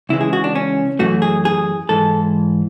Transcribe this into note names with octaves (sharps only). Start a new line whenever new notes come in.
C#2 C#3 E3 G#3 E4
G#4
F#4
D4
C#4
F#2 E3 A3 F#4
G#4
G#4
G#2 E3 G#3 A4